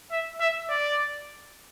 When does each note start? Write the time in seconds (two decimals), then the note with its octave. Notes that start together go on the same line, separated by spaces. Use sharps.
0.11 E5
0.40 E5
0.69 D5